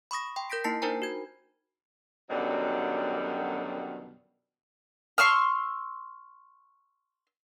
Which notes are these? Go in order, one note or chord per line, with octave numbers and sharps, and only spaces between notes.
B5 C#6 D#6 A#6
G5 C6
A#4 G6 A#6 B6 D7
A#3 D#4 E4 A5 B6 C7
D4 D#4 A#4 C5 G#5 A#5
F#4 G#6
F#2 B2 D3 D#3 F#3 G3
C6 C#6 E6 F6